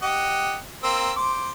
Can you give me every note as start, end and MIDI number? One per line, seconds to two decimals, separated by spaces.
0.02 0.57 67
0.02 0.57 75
0.02 0.57 78
0.83 1.11 58
0.83 1.11 60
0.83 1.11 88
1.16 1.50 72
1.16 1.50 86